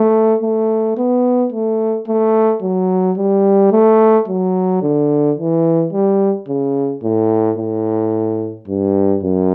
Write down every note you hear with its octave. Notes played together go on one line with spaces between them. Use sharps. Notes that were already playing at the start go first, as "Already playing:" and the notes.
Already playing: A3
A3
B3
A3
A3
F#3
G3
A3
F#3
D3
E3
G3
C#3
A2
A2
G2
F#2